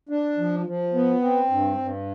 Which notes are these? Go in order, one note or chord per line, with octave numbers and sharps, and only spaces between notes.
D4
F3
F3
B3
C4
G2
G2